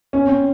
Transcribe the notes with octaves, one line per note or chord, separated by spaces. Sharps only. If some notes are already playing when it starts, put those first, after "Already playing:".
C#4
C4